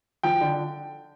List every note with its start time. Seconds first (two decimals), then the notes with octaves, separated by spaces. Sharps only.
0.23 F3 G5
0.41 D3